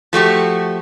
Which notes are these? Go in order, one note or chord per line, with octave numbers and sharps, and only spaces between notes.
F3 A3 F#4 G4